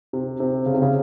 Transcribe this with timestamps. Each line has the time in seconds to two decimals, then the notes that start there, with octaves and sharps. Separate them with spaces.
0.13 C3
0.40 C3
0.66 C#3
0.74 C3
0.82 C#3